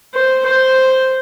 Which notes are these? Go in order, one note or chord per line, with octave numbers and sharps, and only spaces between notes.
C5
C5